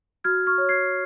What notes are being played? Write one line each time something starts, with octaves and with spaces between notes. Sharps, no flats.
F#4 F6 G#6
C#6 F6
C#5
G#6 C7